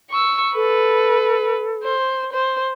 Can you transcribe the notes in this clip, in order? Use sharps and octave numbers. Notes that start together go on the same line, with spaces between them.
C#6 E6
A4 B4
C5
C5